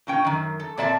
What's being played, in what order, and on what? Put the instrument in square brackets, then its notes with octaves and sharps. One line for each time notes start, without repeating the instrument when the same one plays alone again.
[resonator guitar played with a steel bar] A#2 C#4 G5
F#2 D#3
A4
A#2 C4 D5 E5 A5